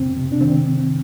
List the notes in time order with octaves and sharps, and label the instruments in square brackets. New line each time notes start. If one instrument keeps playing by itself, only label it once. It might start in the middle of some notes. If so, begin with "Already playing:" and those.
Already playing: [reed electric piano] F2 C3 C4
C3
D4
D#3 C4